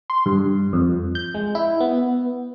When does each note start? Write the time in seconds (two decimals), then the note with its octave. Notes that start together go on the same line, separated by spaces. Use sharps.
0.10 C6
0.26 G2
0.73 F2
1.15 G6
1.34 G#3
1.55 E4
1.80 B3